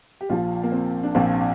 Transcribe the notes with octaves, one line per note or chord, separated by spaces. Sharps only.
G4
A#1 A#2 F3 F4
A#3
C4
D4
A#1 A#2 F3 C4